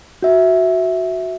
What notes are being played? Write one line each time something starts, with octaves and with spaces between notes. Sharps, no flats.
F#4 E5